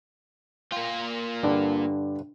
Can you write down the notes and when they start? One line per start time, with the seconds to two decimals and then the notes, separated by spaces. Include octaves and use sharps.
0.72 A#3 F4 G5
1.43 G2 D3 D4